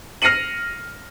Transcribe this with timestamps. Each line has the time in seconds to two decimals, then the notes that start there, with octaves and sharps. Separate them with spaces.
0.22 F6 A#6 C7 C#7 D#7 F#7